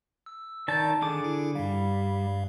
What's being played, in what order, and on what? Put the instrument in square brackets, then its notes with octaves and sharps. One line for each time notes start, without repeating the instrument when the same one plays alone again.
[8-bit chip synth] E6
[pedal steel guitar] D#3 A5 [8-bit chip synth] D5 G6
[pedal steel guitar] D3 G#4 D6 [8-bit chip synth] D#3
[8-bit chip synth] E4
[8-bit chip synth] G2 F5 [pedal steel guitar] G3